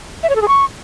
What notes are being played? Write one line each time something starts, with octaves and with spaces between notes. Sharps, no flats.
E5
C#5
A4
G#4
C#6